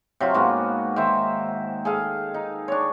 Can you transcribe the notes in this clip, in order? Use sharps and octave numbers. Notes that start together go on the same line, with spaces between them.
C3 F#3 F4
G#2 A#3 B3 F#4
D#3 C5 E5
G#4 A4 F5
D#4
D4 C#5